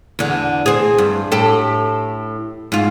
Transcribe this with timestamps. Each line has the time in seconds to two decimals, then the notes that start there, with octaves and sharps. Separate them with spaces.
0.19 E2 D3
0.66 C4 G#4
0.98 G2
1.32 A2 G4 A4
2.72 G#2 F4